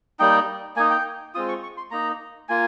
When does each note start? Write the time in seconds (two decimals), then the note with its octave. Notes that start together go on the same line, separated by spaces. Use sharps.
0.20 G3 A#3 D#4 G5
0.76 A#3 G#5
0.79 D#4
0.91 G5
1.35 G#3 C4 F4 D#6
1.48 C#6
1.63 C#6
1.77 C6
1.91 A#3 D#4 A#5
2.49 A#3 F4 G#5